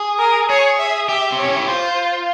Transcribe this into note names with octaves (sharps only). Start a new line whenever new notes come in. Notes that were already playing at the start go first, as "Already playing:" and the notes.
Already playing: G#4
A#4
G#4 C#5
E5
G4 E5
C4
C#5
C#4
E4
F4 C5